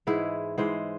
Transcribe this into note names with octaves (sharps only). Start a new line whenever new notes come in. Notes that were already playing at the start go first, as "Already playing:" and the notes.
G#2 E3 G#3 E4 G#4
G#2 E3 G#3 G#4 C5